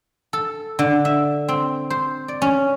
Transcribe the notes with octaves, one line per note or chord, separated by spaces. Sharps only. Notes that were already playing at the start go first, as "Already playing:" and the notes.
A4
D3
E5
C4
C5
D5
C#4